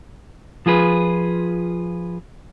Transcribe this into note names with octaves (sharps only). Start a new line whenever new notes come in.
F3 F4 G#4 B4